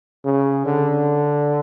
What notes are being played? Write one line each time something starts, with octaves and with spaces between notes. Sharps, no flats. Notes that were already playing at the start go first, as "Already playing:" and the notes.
C#3
D3